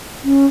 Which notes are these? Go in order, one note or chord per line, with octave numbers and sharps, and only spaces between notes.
C#4